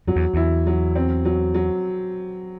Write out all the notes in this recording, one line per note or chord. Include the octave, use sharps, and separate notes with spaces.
F#2 F#3
E2
E2 E4
F#3
C4
F#3
F#3